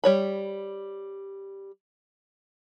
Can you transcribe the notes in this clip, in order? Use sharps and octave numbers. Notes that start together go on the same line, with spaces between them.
G3 C#5 B5